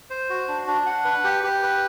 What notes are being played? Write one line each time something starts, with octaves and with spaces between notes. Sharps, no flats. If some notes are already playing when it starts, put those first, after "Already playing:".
C5
F#4
D4
D4
F#5
B4
G4
G4
B4